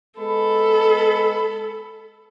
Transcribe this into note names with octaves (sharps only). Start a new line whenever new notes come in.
G#3 B3 A4 B5